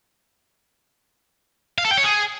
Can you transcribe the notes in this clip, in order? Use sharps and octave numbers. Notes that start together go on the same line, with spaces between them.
F5
A4
G5
C#5
G#4